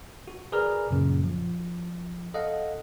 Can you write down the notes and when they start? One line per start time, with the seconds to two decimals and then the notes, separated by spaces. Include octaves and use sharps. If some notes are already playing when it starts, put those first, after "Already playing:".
0.28 F#4
0.52 G#4 A#4 B4 D5 A#5 F6
0.91 F#2 A#2 C#3
1.24 F3
2.34 A4 D#5 F5 F#5